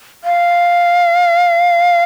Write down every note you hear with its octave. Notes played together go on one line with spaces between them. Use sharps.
F5